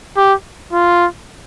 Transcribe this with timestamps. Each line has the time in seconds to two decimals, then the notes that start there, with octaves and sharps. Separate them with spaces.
0.17 G4
0.73 F4